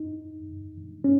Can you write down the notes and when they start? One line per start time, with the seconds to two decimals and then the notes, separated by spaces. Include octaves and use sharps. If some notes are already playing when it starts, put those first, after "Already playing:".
Already playing: D#4
1.04 C#4